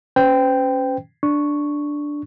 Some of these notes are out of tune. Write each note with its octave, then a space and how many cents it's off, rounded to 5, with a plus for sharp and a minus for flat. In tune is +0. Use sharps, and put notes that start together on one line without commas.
C#4 +0 C5 -45 G5 +0
D4 +0 C#6 +0